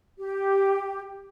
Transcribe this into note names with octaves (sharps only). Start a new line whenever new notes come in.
G4